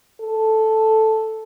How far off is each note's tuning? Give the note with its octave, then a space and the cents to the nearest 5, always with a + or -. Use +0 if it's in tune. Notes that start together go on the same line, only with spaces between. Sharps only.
A4 -5